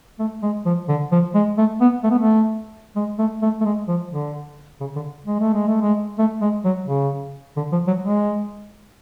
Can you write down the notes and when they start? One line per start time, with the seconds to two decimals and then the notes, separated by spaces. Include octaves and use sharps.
0.19 A3
0.43 G#3
0.66 F3
0.89 D3
1.12 F3
1.34 G#3
1.58 A3
1.81 B3
2.03 A3
2.10 B3
2.18 A3
2.96 G#3
3.19 A3
3.42 A3
3.61 A3
3.65 G#3
3.88 F3
4.11 D3
4.80 C#3
4.96 D3
5.26 G#3
5.40 A3
5.54 G#3
5.68 A3
5.81 G#3
6.18 A3
6.41 G#3
6.65 F#3
6.88 C#3
7.57 D3
7.72 F3
7.87 F#3
8.03 G#3